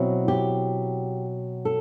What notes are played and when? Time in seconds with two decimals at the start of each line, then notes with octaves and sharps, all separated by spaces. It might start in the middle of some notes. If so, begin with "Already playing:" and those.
Already playing: B2 F#3 C4 E4
0.28 G4
1.65 A4